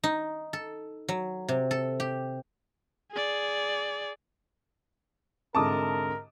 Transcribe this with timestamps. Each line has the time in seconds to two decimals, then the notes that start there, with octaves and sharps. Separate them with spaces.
0.04 D#4
0.53 A4
1.08 F#3
1.48 C3
1.71 A4
2.00 G4
3.12 G#4 D5
5.55 C2 G#2 D3 A#4 A5 D6 D#6